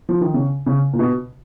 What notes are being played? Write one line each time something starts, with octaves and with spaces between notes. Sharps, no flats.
F3
D#3
C#3
C#3
A#2
B2